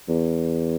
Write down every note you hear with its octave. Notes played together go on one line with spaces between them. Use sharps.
E2